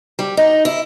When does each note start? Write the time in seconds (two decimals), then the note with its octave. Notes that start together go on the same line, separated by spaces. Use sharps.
0.19 G3
0.37 D#4
0.65 E4